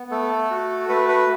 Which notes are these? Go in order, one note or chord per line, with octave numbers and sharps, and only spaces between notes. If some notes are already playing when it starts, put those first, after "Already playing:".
Already playing: B3
A3 A4
F#4
A3 B4
B4